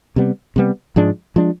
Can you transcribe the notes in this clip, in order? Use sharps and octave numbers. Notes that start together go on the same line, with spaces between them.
C3 G3 B3
C3 G3 B3
G#2 F3 G#3 D4
F3 G#3 D4